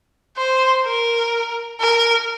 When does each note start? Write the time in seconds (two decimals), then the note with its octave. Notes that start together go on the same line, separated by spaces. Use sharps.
0.37 C5
0.85 A#4
1.80 A#4